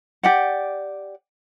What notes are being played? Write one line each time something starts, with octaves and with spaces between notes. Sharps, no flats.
G4 D5 F#5